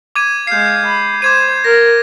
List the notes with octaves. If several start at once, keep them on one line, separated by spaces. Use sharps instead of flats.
D6 G#6 D#7
G#3 F5 G6 C7
B5
C5 D6 G#6 D#7
A#4 A#6